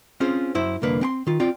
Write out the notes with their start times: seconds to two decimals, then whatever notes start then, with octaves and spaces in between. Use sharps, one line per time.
0.20 C4 C#4 F4 G#4 C5
0.55 F#2 E4 C5
0.82 C2 F2 D3 A#3 B4
1.01 C4 G5 C6
1.27 D#3 F4
1.40 C4 F4 D5 G5